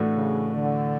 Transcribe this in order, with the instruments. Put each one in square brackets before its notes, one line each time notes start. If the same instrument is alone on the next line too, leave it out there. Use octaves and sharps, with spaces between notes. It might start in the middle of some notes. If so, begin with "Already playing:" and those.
Already playing: [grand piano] A2 E3 A3 D4 F#4
[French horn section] C#3
D3